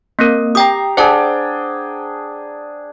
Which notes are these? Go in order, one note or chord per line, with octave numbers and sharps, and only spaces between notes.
A#3 C4 A#4
G4 G5 A#5 D#6
D4 G#4 C5 F#5 G5 A5